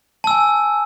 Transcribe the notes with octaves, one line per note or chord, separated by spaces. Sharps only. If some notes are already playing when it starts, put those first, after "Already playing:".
G#5 A5 E6